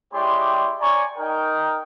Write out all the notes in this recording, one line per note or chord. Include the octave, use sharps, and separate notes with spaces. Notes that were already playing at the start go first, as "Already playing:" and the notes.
G#3 E4 G4 C#5 D5 C6
C#5 D5 G#5 A#5 C#6
D#4 A#4 G5